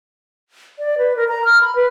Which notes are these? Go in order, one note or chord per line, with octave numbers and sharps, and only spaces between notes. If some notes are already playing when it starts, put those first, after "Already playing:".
D5
B4
A#4
A#5
F6
B5
B4